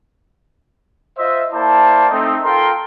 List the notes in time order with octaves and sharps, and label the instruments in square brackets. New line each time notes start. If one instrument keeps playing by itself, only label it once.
[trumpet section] F4 C5 D#5 E5
A#3 E4 C5 D5 A5
A3 C4 D#4
F4 A4 A#4 G5 A#5 C6